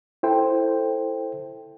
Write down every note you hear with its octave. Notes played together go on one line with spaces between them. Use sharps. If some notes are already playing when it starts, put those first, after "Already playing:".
E4 A4 C5 G5